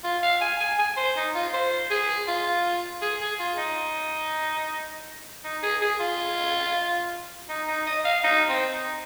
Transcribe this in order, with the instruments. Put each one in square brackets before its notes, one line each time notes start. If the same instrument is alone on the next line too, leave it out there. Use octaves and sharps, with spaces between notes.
[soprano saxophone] F4
F5
G#5
G#5
G#5
C5
D#4
F4
C5
G#4
F4
G#4
G#4
F4
D#4
D#4
G#4
G#4
F4
D#4
D#4
D#5
F5
D#4
C4
D#4